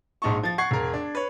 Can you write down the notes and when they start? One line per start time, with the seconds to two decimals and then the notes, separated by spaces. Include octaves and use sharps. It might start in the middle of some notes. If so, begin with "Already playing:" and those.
0.22 A#1 G#2 D#4 A5 C#6
0.43 F3 A6
0.58 F#5 C#6 G#6 C7
0.71 E1 A#4
0.93 D4
1.15 B4 C#5